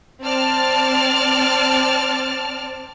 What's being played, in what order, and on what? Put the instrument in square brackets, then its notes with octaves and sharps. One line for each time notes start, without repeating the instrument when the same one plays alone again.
[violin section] C4 D5 A5 F6